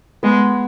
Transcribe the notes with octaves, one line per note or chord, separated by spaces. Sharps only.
G#3 B3